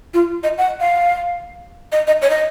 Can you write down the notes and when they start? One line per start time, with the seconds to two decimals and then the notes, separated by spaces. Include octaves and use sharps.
0.14 F4
0.43 D#5
0.58 F#5
0.80 F5
1.92 D#5
2.07 D#5
2.22 C#5
2.30 D#5